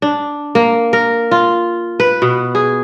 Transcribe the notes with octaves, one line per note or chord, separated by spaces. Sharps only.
D4
A#3
A#4
F4
B4
B2
G#4